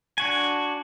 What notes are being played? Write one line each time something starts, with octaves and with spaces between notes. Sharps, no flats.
D4 F#4 G#5